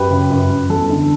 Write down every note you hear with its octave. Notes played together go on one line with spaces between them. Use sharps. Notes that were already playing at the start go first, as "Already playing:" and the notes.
Already playing: F#2 G4 B4
C#3
F#2
F#2
E2 A4
D3